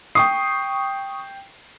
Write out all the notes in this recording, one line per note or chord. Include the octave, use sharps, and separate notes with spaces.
G5 C#6 D#6 C7